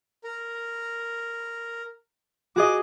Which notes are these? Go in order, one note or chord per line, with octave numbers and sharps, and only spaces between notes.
A#4
F#4 G#4 D#5 D6